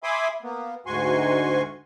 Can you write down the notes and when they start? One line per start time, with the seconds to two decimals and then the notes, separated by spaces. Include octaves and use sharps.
0.03 E5 G#5 B5 C6 D6 D#6
0.43 A#3 B3
0.86 D2 G#2 F#4 G#5 C6 C#6